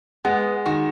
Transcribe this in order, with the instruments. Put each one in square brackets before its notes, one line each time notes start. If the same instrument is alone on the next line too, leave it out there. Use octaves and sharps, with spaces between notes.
[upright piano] G#3 [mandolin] B3
[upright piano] D#3 [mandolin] F#4